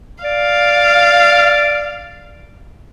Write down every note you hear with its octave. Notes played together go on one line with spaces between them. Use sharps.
D5 F5